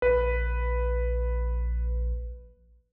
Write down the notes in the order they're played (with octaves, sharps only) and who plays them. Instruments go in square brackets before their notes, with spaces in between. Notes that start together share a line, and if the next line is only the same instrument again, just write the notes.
[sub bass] A#1 [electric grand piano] B4